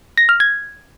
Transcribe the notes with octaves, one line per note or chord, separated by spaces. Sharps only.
A#6
F6
G#6